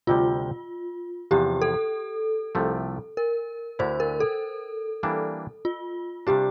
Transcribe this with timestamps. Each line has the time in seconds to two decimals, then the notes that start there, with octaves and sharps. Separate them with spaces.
0.07 D2 C3 G3 F4
1.31 E2 C3 F3 G4
1.62 A4
2.55 C2 C3 F3 A3
3.17 A#4
3.79 D2 D3 A3 E4 C5
4.00 A#4
4.20 A4
5.03 E3 G3 A#3 D4
5.65 F4
6.27 C3 G3 D4 G4